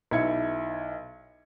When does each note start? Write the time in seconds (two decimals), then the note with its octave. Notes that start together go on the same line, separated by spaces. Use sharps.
0.11 B1 E4 G#6 C#7